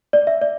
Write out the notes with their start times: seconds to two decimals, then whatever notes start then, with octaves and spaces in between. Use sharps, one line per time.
0.13 D5
0.27 E5
0.42 D5